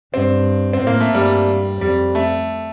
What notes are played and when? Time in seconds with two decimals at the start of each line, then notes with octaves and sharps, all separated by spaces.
0.14 G2 C4
0.73 C4
0.81 A2
0.87 A#3
1.01 A3
1.14 G2 G3
1.81 F2 G3
2.15 A3